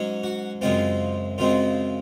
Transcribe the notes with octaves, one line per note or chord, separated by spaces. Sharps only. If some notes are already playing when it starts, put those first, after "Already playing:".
Already playing: G#2 F#3 C#4
F#4
F#2 C#3 G#3 C4 F4
F#2 C#3 G#3 C4 F4